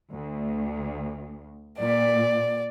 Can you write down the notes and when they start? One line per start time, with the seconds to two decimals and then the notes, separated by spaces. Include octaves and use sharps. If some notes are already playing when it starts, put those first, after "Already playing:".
0.12 D2
1.79 A#2 D5